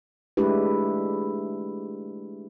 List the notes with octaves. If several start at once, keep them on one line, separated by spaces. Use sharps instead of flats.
G#3 A3 D4 E4 G4 B4